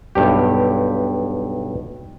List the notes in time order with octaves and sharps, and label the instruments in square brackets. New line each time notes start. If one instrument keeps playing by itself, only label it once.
[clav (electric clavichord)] B1 G2 G4